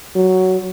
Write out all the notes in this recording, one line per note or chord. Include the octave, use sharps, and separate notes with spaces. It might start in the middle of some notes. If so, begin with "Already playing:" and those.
F#3